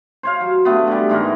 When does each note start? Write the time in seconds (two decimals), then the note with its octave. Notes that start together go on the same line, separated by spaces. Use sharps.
0.23 C5 C#5 F5
0.40 F#3
0.65 D3 A3 B3
0.87 D3 G3
1.09 G#2 E3 B3 A#4